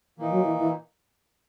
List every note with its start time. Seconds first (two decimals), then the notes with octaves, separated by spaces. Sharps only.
0.18 A#2 E3 A#3 D#4
0.30 F#3
0.43 E3
0.57 E3